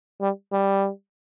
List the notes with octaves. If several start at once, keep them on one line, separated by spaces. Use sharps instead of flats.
G3
G3